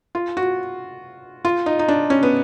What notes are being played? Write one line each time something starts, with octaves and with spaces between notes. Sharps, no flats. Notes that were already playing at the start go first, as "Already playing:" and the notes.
F4
F#4
F4
D#4
D#4
D4
C#4
B3